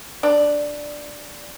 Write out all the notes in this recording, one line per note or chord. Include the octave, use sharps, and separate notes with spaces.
D4 D5